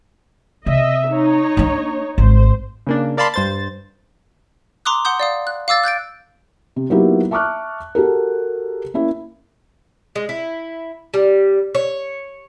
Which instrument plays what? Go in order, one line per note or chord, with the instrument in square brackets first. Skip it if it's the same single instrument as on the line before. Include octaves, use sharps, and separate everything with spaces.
[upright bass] C3 [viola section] D#5 E5
[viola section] D#4 C#5
[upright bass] A#3 D4
[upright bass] G#1 [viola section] C5
[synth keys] C#3 A#3 D4
A#4 D5 F5 A5 B5 C6
G2 C5 A6
[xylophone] A#5 C6 D6 D#6 F#6
F#5 C6 D#6 G6
D5 F5 D#6
F#6
F5 D6 E6 A6
F#6 G6 A6 D7
[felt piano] C3
F#3 A#3 B3 D#4 E4 G4
E5 A5 C#6 D6 F6 F#6
F#4 G4 A4 A#4
A#3 C#4 E4
[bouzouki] G#3
E4
G3
C#5